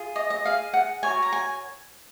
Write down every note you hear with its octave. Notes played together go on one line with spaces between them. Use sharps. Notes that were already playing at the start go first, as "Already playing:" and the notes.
Already playing: F4 G#4
D#5
D#5
G#4 D#5 F5
F#5
F#4 A#4 C#5 G#5
A#5
G#5